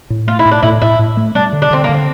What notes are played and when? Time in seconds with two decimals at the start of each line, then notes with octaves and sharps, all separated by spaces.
0.10 A2
0.27 A3 F4
0.39 E4
0.45 A2
0.51 D4
0.63 A2 E4
0.82 A2 E4
0.99 A2
1.17 A3
1.35 G3 D4
1.53 D3
1.62 D4
1.71 D3 C4
1.84 A#3
1.89 D3
1.94 C4